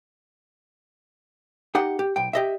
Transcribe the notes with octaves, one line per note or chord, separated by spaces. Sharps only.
D#4 G4 F#5 G5
G4
B1 G5
G4 D#5 E5